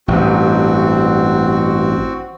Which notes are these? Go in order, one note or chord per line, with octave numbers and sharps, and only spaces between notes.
A1 G2 C4 F#4